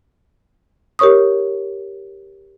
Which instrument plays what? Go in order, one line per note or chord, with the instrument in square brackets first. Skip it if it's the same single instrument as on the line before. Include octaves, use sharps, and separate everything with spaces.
[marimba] G4 A#4 C#5 C#6 D#6